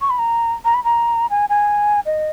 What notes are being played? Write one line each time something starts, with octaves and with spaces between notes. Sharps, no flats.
C#6
B5
A#5
A#5
B5
A#5
G#5
G#5
D#5